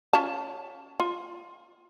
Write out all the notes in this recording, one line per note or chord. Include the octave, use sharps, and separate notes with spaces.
C#4 F4 A5
F4